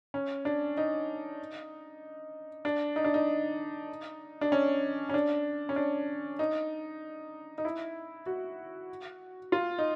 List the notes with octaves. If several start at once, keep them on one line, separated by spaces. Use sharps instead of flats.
C#4
D4
D#4
D4
D#4
D4
D#4
D4
C#4
C#4
D4
C#4
D4
D#4
D#4
E4
F#4
F4
D#4